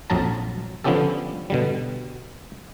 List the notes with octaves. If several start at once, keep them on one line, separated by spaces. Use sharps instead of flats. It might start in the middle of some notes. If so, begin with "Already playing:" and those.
A#1 F2 F#3 A5 A#5
D3 F3 B3 C#4 G4 A4
B2 D3 G3